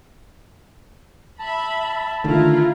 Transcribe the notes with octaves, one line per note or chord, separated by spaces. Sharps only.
E5 A5 B5
D3 D#3 A3 E4 F4 A#5